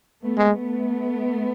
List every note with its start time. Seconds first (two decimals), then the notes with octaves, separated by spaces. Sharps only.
0.23 A3 B3
0.38 G#3
0.53 A3 B3